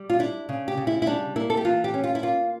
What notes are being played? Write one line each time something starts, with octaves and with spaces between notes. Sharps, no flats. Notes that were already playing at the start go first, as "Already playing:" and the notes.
Already playing: G3
F4
D4 E4
C#3
G4
C#3
E4
E4
G3 D4
A#3 E4
A4
G4
E3 F4
G4
C#4
F4
E4
A#3 F4